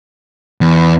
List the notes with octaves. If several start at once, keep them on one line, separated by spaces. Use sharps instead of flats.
E2